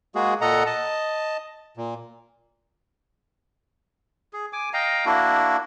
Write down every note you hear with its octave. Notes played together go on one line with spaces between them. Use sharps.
G#3 A#3 F#4 G#4
A#2 A4 D#5 F#5 A#5
D#5 A5
A#2
G#4
G#5 D6
D#5 F5 G5 A#5
A#3 D4 E4 F#4